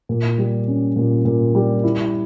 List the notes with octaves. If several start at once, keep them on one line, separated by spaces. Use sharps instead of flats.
A#2
G3
C#4
A#2
A#2
G3
E4